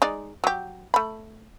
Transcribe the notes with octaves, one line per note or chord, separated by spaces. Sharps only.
G#3 D#4 D5
F#3 G4
A3 B5